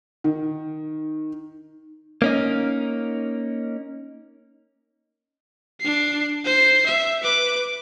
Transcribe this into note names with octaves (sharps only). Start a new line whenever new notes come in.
D#3
A#3 C#4 D#4
D4 C7
C5 C7
E5
B4 D6